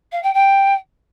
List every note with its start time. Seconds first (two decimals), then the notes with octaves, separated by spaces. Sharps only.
0.12 F5
0.23 G5
0.34 G5